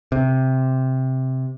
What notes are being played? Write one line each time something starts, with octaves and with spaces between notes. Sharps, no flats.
C3